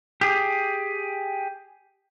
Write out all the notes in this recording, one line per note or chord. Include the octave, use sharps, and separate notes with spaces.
G4 G#4